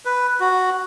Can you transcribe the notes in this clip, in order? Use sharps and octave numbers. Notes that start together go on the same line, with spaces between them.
B4
F#4